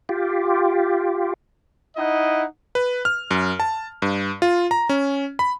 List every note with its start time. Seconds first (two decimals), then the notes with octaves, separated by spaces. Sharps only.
0.09 F4 G4
1.97 D#4 E4 D#5 F#5
2.75 B4
3.05 F6
3.31 F#2
3.60 A5
4.02 G2
4.42 F4
4.71 A#5
4.89 C#4
5.39 B5